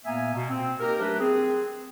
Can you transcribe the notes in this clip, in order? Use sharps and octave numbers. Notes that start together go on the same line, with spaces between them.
A#2 A#3 B3 E5 G#5
B2
C4
A#3 D#4 G4 A#4
F#3 A3 D4 G4 B4
C4 G#4